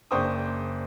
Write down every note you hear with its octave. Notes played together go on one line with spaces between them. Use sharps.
F#1 D4 C5 G5 C#6 D#6